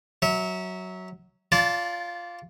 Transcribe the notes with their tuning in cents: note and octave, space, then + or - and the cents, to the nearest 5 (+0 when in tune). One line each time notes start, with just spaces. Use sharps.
F#3 +5 E5 -25
F4 +0 D5 -30 A5 +0